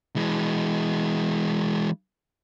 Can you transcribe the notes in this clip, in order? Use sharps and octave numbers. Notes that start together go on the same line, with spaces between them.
E3 G#3